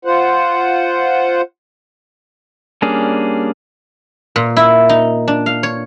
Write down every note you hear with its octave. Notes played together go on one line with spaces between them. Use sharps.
F4 C5 F#5
G3 A#3 C#4 D4 G#4
A#2
E4
D#4
D4
F5
C#5